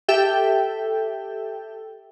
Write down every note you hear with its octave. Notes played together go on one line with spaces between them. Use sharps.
G4 A4 E5 G5